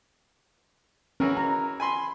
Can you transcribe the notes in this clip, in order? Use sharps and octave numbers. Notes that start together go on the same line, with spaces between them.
E3 C#4 F#4 A#4
A#5
G#5 B5 C6